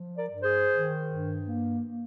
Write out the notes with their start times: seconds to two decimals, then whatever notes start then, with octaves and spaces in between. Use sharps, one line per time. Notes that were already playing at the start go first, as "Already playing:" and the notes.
Already playing: F3
0.18 A#4 D5
0.30 G2
0.43 G#4 C5
0.70 D#3
1.08 G2
1.47 A#3
1.86 A#3